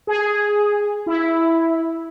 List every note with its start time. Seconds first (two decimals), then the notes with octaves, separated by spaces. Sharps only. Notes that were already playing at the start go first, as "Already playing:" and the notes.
0.07 G#4
1.06 E4